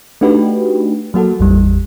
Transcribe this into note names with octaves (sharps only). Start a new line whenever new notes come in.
A3 D4 D#4 F#4 G4 B4
F#3 A#3 F#4 A4
G#1 E2 G3